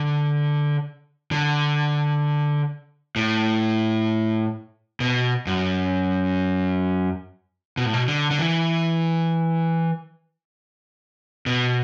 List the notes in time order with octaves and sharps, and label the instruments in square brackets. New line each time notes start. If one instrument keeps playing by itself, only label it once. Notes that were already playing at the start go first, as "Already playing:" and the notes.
Already playing: [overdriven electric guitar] D3
D3
A2
B2
F#2
B2
A2
B2
D3
D3
E3
B2